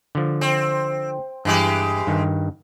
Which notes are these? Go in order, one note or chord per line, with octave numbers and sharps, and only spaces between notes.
D3 F3
C4
G2 E3 G#3 G4
G2 D#3